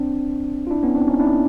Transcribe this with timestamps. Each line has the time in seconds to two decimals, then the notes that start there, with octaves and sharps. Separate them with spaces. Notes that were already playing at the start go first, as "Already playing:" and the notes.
Already playing: C4 D4
0.67 F4
0.71 D4 E4
0.83 B3 C#4
0.95 C4 D4
1.07 C#4 D#4
1.19 D4 E4